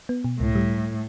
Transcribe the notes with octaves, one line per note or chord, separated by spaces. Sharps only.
B3
B2
C#2 A2
G3